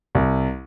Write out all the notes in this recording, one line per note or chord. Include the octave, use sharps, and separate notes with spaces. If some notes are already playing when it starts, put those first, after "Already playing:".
C2